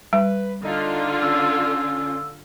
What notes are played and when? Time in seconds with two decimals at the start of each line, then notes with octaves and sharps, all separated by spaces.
0.13 G3 B4
0.65 D3 D#4 F4
1.22 C#4 E6